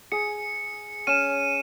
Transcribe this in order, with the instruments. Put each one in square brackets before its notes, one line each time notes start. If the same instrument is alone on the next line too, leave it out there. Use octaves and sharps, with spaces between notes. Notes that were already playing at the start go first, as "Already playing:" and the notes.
[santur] G#4 [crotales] C#7
[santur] C#4 [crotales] D#7 E7